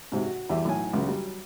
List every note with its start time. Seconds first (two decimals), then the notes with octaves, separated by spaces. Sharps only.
0.12 G#2 C3 F#4
0.24 F#4
0.50 E2 G3 G4 E5
0.65 B1 A2 G#5
0.93 C#2 F#2 C#3
1.07 F#3 G3